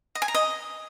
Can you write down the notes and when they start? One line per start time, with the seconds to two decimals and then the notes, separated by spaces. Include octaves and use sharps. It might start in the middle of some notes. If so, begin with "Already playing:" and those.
0.15 D#5
0.22 G#5
0.28 A#5
0.35 D#5